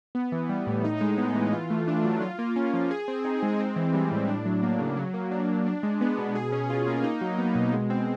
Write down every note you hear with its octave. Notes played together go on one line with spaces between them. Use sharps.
B3
E3
G3
A2
D#4
G#3
B3
E3
F4
A3
D4
F#3
F4
A#3
C#4
F3
G#4
C4
D#4
G#3
C4
E3
G3
A2
D4
F#3
A#3
C#3
F#3
A#3
D4
F#3
D4
G#3
B3
B2
G#4
C#4
F4
A#3
D#4
F#3
B3
B2
G#3
C4